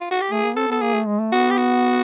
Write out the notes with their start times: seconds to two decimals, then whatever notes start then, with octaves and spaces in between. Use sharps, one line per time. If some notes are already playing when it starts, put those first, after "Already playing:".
0.01 F4
0.11 F#4
0.21 G4
0.31 A3 G#4
0.44 A#3
0.56 C4 A4
0.68 B3 A4
0.81 A#3 G#4
0.94 A3
1.07 G#3
1.20 A3
1.32 B3 F#4
1.51 G4
1.57 F#4